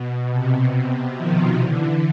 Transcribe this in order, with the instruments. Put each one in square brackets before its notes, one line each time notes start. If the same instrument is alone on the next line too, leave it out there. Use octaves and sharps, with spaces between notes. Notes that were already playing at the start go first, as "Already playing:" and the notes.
Already playing: [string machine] B2
C3
D#3 F3
D3 E3